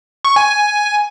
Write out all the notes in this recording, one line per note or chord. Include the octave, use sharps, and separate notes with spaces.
C#6
G#5
G#5